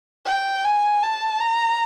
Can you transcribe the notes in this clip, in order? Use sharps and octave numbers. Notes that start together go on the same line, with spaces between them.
G5
G#5
A5
A#5